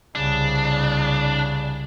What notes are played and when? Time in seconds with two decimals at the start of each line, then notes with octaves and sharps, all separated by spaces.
0.15 C2 C#3 D4